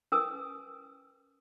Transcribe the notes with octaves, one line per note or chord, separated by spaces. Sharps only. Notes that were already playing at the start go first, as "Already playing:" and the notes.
C#4 A#4 B4 G#5 D#6 E6